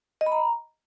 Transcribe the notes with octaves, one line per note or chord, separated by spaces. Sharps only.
D#5
B5
A#5